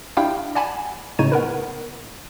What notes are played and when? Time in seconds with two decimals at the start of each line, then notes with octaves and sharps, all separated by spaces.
0.17 D4 E4 G4 F5 G5
0.55 D5 F#5 G#5 A5 B5
1.19 A2 C#3 D#4 C#5 D#7
1.32 B3 A#4 B4